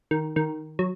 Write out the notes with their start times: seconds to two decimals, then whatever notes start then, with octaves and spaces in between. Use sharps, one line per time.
0.11 D#3
0.36 D#3
0.79 F#3